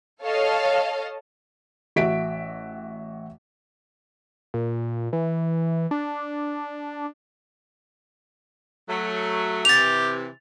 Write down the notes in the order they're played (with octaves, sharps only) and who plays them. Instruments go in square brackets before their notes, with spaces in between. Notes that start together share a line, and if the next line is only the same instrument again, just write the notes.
[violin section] A4 C#5 D#5 F5 A5
[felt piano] A1 F#4 E5 B6 D7
[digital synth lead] A#2
E3
D4
[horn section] F#3 A3
[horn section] C3 E3 [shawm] G4 [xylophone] A6 F7